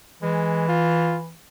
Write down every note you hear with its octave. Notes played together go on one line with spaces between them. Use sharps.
E3 G#3
F4